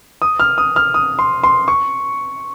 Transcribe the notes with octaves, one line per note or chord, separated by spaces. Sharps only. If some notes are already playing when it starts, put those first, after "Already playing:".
D#6
F6
D#6
F6
D#6
C6
C6
C#6